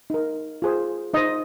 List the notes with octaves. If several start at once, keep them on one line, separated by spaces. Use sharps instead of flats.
D#4 A#4
F4 G#4 C5
D#4 C5 D#5